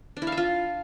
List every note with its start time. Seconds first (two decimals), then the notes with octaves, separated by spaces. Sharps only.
0.17 D4
0.22 E4
0.27 F5
0.32 E5
0.37 F4